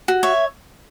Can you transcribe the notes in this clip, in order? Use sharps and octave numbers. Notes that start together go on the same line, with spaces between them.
F#4
C#5 E5